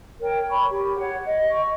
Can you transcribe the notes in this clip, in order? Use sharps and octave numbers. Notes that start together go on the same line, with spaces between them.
A#4 C#5 G5
C#5 B5 C#6
G4
C#5 F#5
D#5
C#6